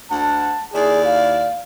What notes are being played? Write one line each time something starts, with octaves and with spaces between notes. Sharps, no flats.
D2 F#5 A5
D#2 E4 G#4 D5
F5